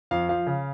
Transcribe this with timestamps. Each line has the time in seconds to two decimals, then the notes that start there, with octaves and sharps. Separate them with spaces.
0.11 F2 F5
0.29 F3 F5
0.46 C#3